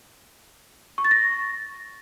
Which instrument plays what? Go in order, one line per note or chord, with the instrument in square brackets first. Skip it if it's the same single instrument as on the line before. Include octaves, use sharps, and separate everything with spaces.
[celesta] C#6
A6
A#6